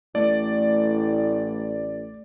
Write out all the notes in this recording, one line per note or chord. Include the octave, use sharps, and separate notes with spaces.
A1 A2 A3 D5